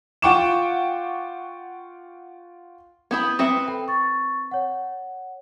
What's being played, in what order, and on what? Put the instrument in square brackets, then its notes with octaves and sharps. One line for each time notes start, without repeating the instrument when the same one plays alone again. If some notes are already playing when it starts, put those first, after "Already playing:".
[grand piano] F4 F#5 G5 C#6 D6 E7
[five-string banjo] B3 E4 B5 [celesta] D#6 G6 G#6
[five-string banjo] C4 B4 E5 [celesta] D#6 C#7
[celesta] A4 G5 B5
C#6 A6
C#5 F#5